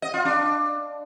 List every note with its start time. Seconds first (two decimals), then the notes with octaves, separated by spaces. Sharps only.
0.02 D#5
0.14 F4
0.25 D4